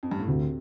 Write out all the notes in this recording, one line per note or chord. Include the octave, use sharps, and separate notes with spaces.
F2
G2
A2
D2 C3